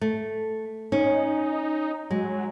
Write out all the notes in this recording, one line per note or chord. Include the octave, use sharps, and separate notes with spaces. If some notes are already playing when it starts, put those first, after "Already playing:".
A3
C#4 D#4
F#3 G#3